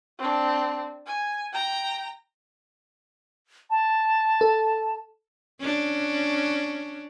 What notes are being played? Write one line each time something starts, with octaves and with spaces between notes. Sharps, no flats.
C4 D4
G#5
G5 A#5
A5
A4
C#4 D4